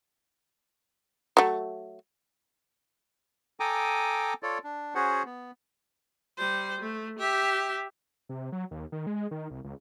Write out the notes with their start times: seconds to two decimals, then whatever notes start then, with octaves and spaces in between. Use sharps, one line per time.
1.37 F#3 A3
3.60 A4 G5 G#5 A#5 D6 D#6
4.43 F4 A4 C#5 D5
4.64 D4
4.95 C#4 F#4 G#4 C5 F#5
5.25 B3
6.38 G3 C5
6.80 A3
7.18 G4 E5
8.29 C3
8.52 F#3
8.71 D#2
8.92 D#3
9.07 G#3
9.31 D#3
9.50 C2
9.64 C#2